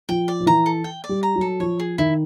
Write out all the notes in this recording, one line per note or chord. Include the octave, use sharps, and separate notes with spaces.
F3 G5
D5
F3
E3 A#5
A4
G5
D5
G3
A#5
F#3
A4
F3 C#5
G#4
D#3 E4